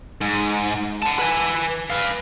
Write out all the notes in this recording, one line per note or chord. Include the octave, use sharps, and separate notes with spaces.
G#2
F#5 A5
B4 G#5
B4 F5